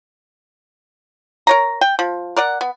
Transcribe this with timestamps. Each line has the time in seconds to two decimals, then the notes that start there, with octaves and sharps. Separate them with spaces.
1.47 A#4 C#5 A#5
1.81 G5
1.99 F3
2.36 A#4 D5 F#5
2.61 B3